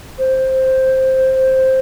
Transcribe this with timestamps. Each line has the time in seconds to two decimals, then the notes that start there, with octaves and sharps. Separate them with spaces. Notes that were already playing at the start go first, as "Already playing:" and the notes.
0.19 C5